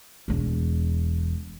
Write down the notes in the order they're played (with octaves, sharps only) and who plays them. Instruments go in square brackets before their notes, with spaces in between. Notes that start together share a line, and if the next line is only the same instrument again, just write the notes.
[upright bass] E1 E2